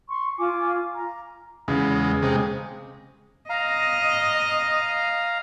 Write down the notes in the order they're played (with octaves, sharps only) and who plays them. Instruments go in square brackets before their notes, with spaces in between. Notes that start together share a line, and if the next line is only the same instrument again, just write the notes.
[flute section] C6 C#6
F4 G#5 D6
A#5
[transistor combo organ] E2 G#3 [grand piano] C#3
[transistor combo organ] C3 G#3
[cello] D#5 [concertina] F5 A#5